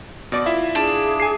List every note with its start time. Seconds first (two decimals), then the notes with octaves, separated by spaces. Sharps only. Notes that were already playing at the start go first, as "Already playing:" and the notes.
0.32 B2 D5 D6
0.46 E4 F4 E5
0.75 D4 G#4
1.20 G#5 C7